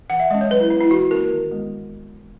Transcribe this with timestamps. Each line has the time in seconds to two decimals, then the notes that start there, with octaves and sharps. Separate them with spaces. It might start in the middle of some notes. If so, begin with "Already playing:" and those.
0.10 E3 F#5
0.20 E5
0.31 G#3 C#4 D#5
0.41 C#5
0.50 F#3 B4
0.60 E4
0.70 B3 E4
0.81 E4
0.91 E3 F#4
1.11 A#3 C#4 A#4
1.31 D#3
1.51 G#3 B3